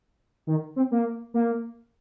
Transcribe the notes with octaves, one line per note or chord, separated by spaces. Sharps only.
D#3
C4
A#3
A#3